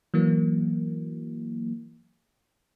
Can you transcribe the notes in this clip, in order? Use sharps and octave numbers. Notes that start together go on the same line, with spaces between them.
E3 F#3 A#3